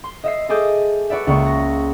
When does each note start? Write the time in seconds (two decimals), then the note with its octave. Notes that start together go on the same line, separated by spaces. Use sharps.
0.04 C6
0.24 D#5 E5 C7
0.49 G#4 A4 D#5 D6 G6
1.10 F#4 B4 D5 E5
1.27 C#2 A#3 D5 C#6
1.46 A#6